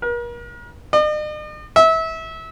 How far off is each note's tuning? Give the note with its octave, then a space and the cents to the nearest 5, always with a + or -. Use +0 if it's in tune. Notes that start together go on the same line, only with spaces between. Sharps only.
A#4 +40
D#5 -45
E5 -25